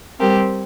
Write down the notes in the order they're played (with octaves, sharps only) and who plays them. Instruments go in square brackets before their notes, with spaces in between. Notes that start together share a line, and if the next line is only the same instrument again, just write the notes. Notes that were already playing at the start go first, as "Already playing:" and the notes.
[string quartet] G3 C4 G4 A#4